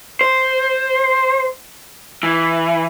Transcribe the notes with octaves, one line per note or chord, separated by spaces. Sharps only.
C5
E3